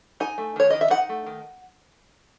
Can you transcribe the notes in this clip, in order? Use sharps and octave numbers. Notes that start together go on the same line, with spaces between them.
D#4 G#5
A3
D#3 C#5
D#3 D#5
E5
D#4 F#5
A3
D#3